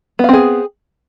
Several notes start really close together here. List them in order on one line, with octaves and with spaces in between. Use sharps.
B3 F5 C4 G#4